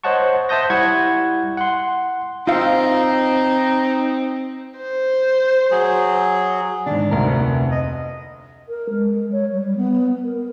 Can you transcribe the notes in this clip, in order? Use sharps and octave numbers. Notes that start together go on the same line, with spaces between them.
C5 C#5 D#5 F#5 A5 C#6
C5 E5 A5 D#6 G6 A#6
G3 E4 F#5 C#6 G#6
F#5 C6
C4 D#4 F4 E5 F5
C5
F#3 G#4
G#2 D3 D4
F1 D2 A#4
B3
D#5
A#4
G#3
C#5
G3
B3
A#4